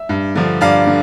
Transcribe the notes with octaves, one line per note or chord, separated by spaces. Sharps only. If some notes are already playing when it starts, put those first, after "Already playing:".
Already playing: E5
G2
D3 F3
G2 D5 F5
D3